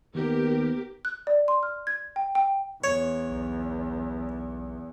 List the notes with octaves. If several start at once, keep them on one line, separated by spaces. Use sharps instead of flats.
D#2 D#3 B3 G4 A#4
F#6
D5
C6
F6
G#6
G5
G5
E2 C#5
B1